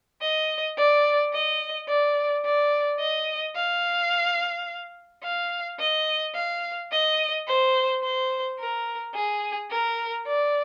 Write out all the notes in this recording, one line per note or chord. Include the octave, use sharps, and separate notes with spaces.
D#5
D5
D#5
D5
D5
D#5
F5
F5
D#5
F5
D#5
C5
C5
A#4
G#4
A#4
D5